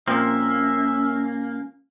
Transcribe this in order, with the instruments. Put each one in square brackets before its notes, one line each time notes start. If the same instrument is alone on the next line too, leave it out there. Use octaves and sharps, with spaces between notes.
[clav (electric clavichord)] A#2 F3 C4 [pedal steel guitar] A#3 [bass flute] C#4 [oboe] E5